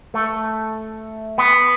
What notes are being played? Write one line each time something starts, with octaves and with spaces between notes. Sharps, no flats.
A3
B3